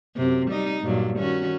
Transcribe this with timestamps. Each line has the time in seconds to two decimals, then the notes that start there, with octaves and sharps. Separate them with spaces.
0.16 F#2 C3
0.51 G3 D#4 D#5
0.83 G2 A#2 F#3
1.19 D#3 C#4 F#4